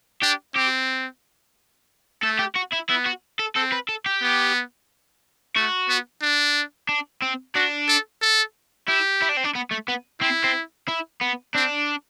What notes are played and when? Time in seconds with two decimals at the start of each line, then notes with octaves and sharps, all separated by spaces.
0.22 D4 G4
0.56 C4 G4
2.23 A3 A4
2.39 G4
2.56 F#4
2.73 E4
2.89 B3 E4
3.06 F#4
3.40 A4
3.56 C4 A4
3.72 B4
3.89 A4
4.06 G4
4.22 B3
5.56 A3 F#4
5.89 B3
6.22 D4
6.89 D4
7.22 C4
7.55 D4 F#4
7.89 A4
8.22 A4
8.88 E4 G4
9.22 E4
9.29 D4
9.37 C4
9.44 D4
9.55 B3
9.71 A3
9.88 B3
10.21 C4 E4
10.44 C4
10.88 E4
11.21 B3
11.55 C4 D4